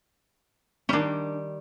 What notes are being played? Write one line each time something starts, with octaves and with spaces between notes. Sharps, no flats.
D#3 G3 C#4 D4